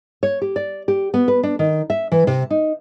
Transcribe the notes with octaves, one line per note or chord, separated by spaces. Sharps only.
C#5
G4
D5
G4
B3
B4
D4
D#3
E5
E3
C3
D#4